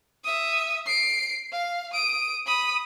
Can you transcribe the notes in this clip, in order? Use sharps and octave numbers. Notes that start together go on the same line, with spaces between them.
E5 D#6
C7 D7
F5
D#6 D7
B5 D#6